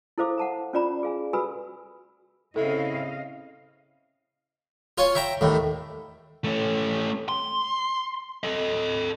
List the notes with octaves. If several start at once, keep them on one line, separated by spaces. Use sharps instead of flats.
E4 A4 C5 F5 D6
F#5 A5 A#5
C#4 F4 D5 A#5 B5
G#4 F5 G#5
F#4 A4 B4 G#5 B5 E6
C#3 C4 E4 A4 D#5 F5
F4 C#5 G#5
E5 G5 A#5
D#2 A2
A3 C#4
C6
A4 D#5